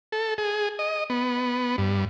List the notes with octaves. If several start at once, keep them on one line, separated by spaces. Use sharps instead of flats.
A4
G#4
D#5
B3
G2